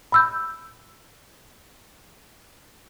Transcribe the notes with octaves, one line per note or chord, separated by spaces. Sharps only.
B5 E6 G6